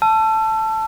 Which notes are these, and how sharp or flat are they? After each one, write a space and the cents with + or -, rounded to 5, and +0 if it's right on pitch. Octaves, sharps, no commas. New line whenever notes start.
A5 +0 E6 +35